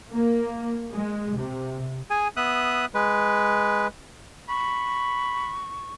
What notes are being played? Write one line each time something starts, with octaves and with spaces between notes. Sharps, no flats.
A#3
G#3
C3
G#4 G#5
B3 E5 D#6 F#6
G#3 B4
B5 C#6